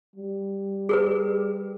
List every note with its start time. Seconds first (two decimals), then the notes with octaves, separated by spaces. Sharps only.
0.16 G3
0.89 G#4 A#4 B4